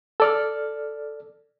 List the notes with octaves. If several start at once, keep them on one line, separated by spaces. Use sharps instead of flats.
A4 D5 F6